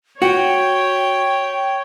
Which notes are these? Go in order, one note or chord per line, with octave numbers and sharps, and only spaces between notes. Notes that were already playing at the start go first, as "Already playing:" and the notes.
F#4 C#5 G5